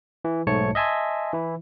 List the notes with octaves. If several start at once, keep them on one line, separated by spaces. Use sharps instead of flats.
E3
B1 G#2 A3 C#5 A5 C#7
D#5 E5 G#5 A5 C6
E3 E4